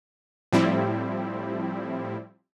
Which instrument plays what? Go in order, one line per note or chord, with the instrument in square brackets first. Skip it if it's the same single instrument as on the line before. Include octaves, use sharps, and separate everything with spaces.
[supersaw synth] A2 F3 G3 C4 E4